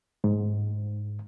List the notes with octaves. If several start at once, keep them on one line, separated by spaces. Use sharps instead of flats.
G#2